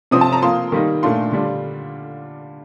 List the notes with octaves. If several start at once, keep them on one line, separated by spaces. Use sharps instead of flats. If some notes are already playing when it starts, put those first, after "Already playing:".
C3 F3 C4 D#6
A5
A#5
F3 A#3 F4 C6
D#3 G3 A#3 D#4
A#2 A3 D4 F4 C6
D3 G3 D4 F4